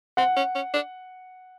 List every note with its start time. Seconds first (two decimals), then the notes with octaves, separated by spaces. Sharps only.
0.17 C4 F#5
0.36 C#4
0.55 C#4
0.74 D4